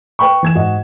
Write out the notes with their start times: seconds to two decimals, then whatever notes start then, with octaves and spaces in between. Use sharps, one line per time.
0.19 B4 G5 B5 C#6
0.43 E3 G#6 E7
0.55 G#2 F#4 D#5